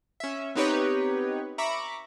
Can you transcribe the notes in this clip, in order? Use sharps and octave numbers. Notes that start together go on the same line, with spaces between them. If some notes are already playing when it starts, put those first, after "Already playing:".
C#4 E5
B3 C4 D#4 G4 B4 C#5
E5 A#5 B5 C#6 D6